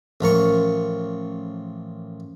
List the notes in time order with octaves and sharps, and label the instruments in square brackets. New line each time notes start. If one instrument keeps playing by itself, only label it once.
[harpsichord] A1 F3 A#4 C#6